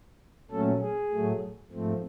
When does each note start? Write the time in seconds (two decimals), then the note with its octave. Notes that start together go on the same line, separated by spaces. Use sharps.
0.51 A#2 F#3 A3 C#4 A4
0.81 G#4
1.12 A2 F#3 A3
1.72 G#2 F3 A3 C4